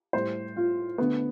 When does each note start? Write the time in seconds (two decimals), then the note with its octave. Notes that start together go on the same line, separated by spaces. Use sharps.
0.13 A2 G3 C5
0.57 F4
0.98 D3 A3 B3